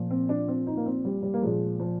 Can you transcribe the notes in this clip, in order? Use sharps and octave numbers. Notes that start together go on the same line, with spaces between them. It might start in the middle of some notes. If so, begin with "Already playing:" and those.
Already playing: A#2 F3
C4
D4
C4
D#4
A#3
C4
G3
G3
A#3
A#2 F3 G#3
F3